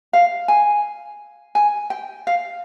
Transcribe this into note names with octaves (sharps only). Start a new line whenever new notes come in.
F5
G#5
G#5
G5
F5